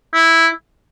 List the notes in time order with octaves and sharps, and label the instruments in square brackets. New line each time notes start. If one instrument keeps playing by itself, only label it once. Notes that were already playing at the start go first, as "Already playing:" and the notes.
[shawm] E4